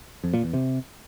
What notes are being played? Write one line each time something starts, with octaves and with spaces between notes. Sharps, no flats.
F2
A#2
E2
C3